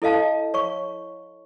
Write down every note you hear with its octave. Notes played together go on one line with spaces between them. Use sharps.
E4 A4 D#5 F5 A5
C#5 C#6